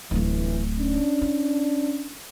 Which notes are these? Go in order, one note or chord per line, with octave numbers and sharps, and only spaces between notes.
D1 G1 E3 A3
C#4 D4
E4